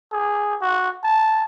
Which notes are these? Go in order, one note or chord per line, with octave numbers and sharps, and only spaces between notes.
G#4
F#4
A5